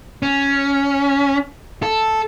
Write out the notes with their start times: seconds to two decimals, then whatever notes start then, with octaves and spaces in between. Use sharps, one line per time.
0.23 C#4
1.83 A4